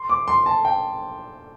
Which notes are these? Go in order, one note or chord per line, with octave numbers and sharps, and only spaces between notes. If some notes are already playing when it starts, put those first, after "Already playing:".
Already playing: C6
D6
C6
A5
G5